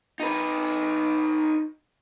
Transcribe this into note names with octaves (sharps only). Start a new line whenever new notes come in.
D#4 B4